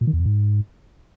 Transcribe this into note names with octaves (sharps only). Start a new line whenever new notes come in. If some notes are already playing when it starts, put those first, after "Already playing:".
A#2
D#3
E2
F2
G#2